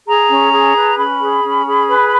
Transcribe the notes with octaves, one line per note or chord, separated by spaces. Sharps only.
G#4 A#5
C#4
G#4
B4
C#4 B5
G#4
C#4
G#4
B4